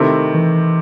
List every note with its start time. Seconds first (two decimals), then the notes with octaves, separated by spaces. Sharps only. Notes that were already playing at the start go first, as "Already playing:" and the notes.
Already playing: C3 D#3 A3 C4 E4
0.34 E3